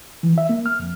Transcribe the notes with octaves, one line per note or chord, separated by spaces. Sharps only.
E3
E5
A#3
F6
F2